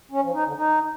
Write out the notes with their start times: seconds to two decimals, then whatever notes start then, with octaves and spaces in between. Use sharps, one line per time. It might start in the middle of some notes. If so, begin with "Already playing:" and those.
0.11 C#4
0.22 F3
0.34 D#4
0.45 D3
0.56 D#4